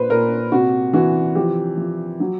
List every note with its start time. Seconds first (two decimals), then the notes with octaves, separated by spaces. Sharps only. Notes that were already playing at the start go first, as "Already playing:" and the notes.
Already playing: A#2 B4 C5
0.10 A#2 A#4
0.52 C3 F#4
0.93 E3 F#4
1.35 F3 G4
1.77 F3
2.20 F#3